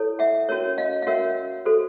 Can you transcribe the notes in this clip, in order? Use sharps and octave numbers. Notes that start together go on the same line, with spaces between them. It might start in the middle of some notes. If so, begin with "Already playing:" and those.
Already playing: E4 A4 C#5
E5 F#5
C#4 F#4 A#4 C#5
D#5 F5
F5
C#4 F#4 A#4 C#5 E5 F#5
F#4 A4 C5